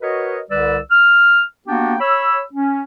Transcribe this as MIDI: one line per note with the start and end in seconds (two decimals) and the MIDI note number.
0.02 0.40 66
0.02 0.40 70
0.02 0.40 71
0.02 0.40 73
0.02 0.40 75
0.51 0.78 36
0.51 0.78 50
0.51 0.78 55
0.51 0.78 71
0.51 0.78 74
0.51 0.78 88
0.91 1.43 89
1.67 1.95 58
1.67 1.95 59
1.67 1.95 62
1.67 1.95 66
1.67 1.95 67
1.67 1.95 79
2.01 2.41 73
2.01 2.41 83
2.01 2.41 88
2.53 2.82 61